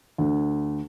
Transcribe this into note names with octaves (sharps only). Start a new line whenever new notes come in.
D2